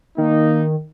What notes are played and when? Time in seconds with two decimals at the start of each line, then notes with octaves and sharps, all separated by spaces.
0.18 D#3 A#3 D#4